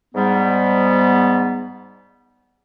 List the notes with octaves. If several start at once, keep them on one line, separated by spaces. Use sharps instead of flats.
G#2 G3 B3